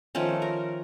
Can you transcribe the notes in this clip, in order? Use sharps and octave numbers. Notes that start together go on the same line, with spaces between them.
D#3 F3 A3 C#4
A#4